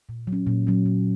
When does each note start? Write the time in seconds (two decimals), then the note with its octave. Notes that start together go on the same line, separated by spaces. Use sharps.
0.09 A#2
0.27 F#3
0.32 C#4
0.47 A#2
0.67 F#3 C#4
0.86 A#2